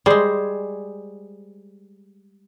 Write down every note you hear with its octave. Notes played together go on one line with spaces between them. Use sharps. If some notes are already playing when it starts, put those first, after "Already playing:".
G3 G#3 G#4 C5